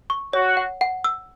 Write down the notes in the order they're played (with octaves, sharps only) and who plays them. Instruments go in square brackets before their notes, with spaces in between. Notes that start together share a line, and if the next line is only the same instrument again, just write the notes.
[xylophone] C#6
[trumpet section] F#4 [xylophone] C#5
[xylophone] F#5
F#5
E6